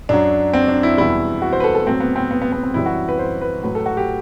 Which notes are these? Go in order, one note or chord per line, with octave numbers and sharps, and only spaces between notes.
F#2 F#3 D4
C4
D4
E4
E2 B2 G3 E4
F#4
C5
B4
A4
A4
A2 F#3 C4
B3
C4
B3
B3
B3
C4
F#2 E3 G3 E4
F#4
B4
C5
B4
A2 F#3 B4
A4
F#4
G4